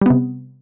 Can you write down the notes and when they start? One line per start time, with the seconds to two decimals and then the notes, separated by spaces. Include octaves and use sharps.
0.01 G3
0.06 B3
0.10 C3